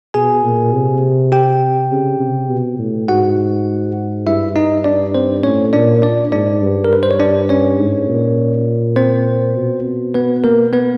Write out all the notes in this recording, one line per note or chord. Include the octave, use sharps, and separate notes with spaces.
B2 G#4 G#5
A#2
C3
G4 G5
C#3
C3
B2
A2
G#2 F#4 F#5
G2 E4 E5
D#4 D#5
D4 D5
C4 C5
A2 C#4 C#5
A#2 D4 D5
D4 D5
G#2 D4 D5
G2
A#4
B4
C5
C#5
D4 D5
C#4 C#5
G#2
A#2
C4 C5
B2
B3 B4
A#3 A#4
B3 B4